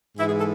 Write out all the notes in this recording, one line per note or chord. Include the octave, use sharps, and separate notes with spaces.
G#2 E3 E4
G#4
A4